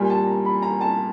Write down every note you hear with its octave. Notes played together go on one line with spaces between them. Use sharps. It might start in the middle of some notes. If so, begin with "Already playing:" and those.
Already playing: A#2 G3 G#5
A5
A#5
B5
A#5
A5